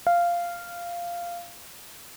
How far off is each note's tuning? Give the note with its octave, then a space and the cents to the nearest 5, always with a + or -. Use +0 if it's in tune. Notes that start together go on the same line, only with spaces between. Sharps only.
F5 -10